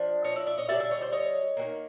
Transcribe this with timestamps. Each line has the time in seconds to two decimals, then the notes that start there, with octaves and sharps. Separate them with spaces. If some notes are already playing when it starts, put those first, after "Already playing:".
Already playing: F3 D4
0.24 C#5 D#5
0.36 D5 E5
0.46 D5 E5
0.58 C#5 D#5
0.68 D3 G3 B3 D5 E5
0.79 D5 E5
0.91 C#5 D#5
1.01 C5 D5
1.12 C#5 D#5
1.57 D#3 F#3 A#3